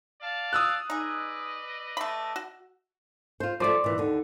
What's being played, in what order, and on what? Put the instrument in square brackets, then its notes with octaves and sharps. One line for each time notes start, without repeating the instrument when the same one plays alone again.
[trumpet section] D5 F5 A5
[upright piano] D#6 E6 F#6
[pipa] D#4 G#4 [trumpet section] B4 D5 D#5
[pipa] A3 B5
F#4
[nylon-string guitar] F4 C5
[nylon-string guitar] F3 A3 [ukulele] C5 D5
[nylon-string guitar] A#2 E3
D#2 D3